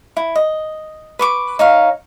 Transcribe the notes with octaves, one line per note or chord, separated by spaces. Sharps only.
E4
D#5
B4 C#6 D6
D#4 C#5 F5